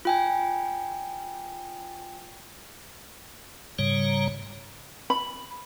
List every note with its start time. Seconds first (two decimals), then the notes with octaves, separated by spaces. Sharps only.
0.05 F4 G5 G#5
3.79 G#2 C#3 G3 C#5 A#5
5.10 B5